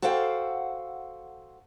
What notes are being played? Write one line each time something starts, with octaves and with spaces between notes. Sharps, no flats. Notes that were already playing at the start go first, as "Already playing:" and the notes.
F#4 A4 C5 F5 G5